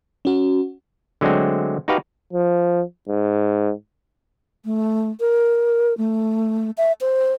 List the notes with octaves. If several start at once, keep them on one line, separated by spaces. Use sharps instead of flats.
C#4 F#4
D3 F#3 G#3 A3 C4
D#4 F#4 G4 B4 F5
F3
G#2
A3
A#4
A3
E5
C5